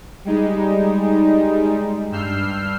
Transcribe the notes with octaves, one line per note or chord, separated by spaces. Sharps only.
G3 G#3 D#4
G2 E6 F6 G6 C7